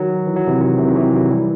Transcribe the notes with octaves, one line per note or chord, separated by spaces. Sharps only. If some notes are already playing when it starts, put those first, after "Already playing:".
Already playing: D#3 F#3
E3
F#3
C3 E3
D#3 F#3
C3 E3
D#3
C3 E3
D#3 F#3
E3 G3